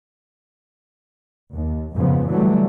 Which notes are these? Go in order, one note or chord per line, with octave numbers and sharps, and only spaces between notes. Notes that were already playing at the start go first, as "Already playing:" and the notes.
D#2
F2 G#2 C#3 F3 B3
D3 E3 F#3 G3 A3